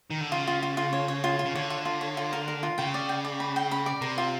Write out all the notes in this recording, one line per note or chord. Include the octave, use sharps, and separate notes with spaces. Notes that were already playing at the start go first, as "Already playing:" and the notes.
D#3
D3
C#3 F4
F4
F4
F4
C#5
C#5
F4
F4
C#3
D3 C#5
F4
F4
C#5
F4
A#4
A#4
F4
C#3 G5
D5
G5
D5
B5
G5
B5
D5
C3 A#4
F4